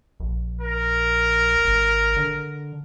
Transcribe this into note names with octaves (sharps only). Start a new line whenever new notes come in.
A#1
A#4
G#1
D3